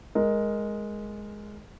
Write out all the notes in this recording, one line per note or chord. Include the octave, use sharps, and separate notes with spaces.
G#3 A#4